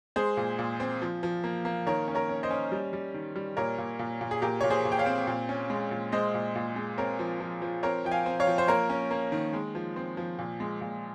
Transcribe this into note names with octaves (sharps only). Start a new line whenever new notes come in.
G#3 G#4 C5
A#2
A#2
C4
F3
F3
A#3
A#3
D#3 A#4 C#5
C#4
A#4 C#5
C#4
C5 D#5
C#4
G3
G3
D#3
G3
A#2 A#4 C#5
A#2
A#2
A#2
G#4
A#2 G4 A#4
A#2 C#5
G#4 C5
A#2
G5
C#5 F5
C4
A#2
C#4
G#3
A#2
G#3 C5 D#5
A#2
A#2
G#3
C4 A#4 C#5
F3
F3
F3
C4 A#4 C#5
F3 G5
F5 G#5
C4
C#5 F5
F3
C5
A#3 A#4 C#5
C#4
A#3
D#3
G#3
F3
C4
F3
A#2
G#3
A#2